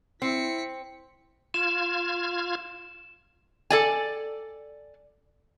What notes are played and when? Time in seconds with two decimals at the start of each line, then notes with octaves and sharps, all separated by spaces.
0.22 C4 E4 B6 C#7
1.54 F4 F6 G#6 E7
3.70 A4 D5 G#5